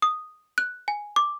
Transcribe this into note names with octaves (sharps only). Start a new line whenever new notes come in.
D#6
F#6
G#5
D6